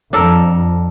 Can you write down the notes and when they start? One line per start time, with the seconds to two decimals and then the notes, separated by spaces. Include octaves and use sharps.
0.13 F2 D4 A4 A#4